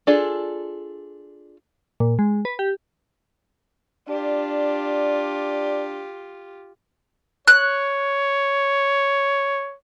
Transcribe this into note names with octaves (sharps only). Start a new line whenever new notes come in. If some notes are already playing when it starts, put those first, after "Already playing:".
D4 F4 G#4 A4 D5
A#2
G#3
B4
G4
D4 F4 G4 D5
C#5 F#6